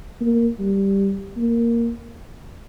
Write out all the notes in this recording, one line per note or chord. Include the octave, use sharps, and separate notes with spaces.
A#3
G3
A#3